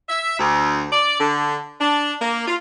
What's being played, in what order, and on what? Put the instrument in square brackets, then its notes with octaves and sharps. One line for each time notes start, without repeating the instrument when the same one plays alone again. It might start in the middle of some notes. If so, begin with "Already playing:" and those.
[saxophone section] E5
D2
D5
D3
D4
A#3
F4